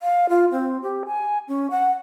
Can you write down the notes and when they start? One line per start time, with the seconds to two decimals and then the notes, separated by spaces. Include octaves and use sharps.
0.01 F5
0.29 F4
0.51 C4
0.83 G4
1.06 G#5
1.48 C#4
1.71 F#5